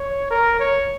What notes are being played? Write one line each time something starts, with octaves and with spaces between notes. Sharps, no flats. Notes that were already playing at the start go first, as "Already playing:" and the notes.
Already playing: C#5
A#4
C#5